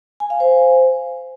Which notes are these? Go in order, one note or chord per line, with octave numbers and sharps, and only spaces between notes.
G#5
F5
C5